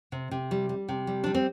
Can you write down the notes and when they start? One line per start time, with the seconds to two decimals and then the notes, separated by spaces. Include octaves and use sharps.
0.12 C3
0.31 C3
0.51 G3
0.69 G3
0.89 C3
1.07 G3
1.24 G3 D4
1.34 C4